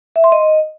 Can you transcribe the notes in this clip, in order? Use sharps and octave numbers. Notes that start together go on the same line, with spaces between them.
E5
C6
D#5